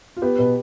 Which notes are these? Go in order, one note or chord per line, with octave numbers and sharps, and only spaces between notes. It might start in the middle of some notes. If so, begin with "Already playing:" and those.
F4
B3 G4
B2 B4